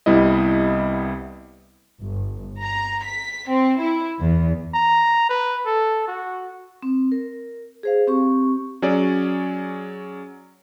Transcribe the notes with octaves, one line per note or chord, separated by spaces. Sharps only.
C2 G3 B3 E4 D#5
G1
A#5
B6
C4
E4
E2
A#5
B4
A4
F#4
C4
A#4
G#4 C5 F5
C4 G4 C#6
F#3 C#4 G#4 D5